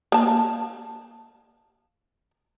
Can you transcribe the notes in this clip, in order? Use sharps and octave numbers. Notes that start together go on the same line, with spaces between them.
A#3 A5